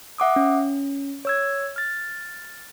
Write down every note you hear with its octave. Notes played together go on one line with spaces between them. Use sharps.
E5 F#5 D6 D#6
C#4
C#5 E6 G#6
F6 A6